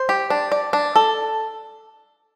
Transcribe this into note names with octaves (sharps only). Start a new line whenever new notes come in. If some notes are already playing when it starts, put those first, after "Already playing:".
Already playing: C5
G4
D4
D5
D4
A4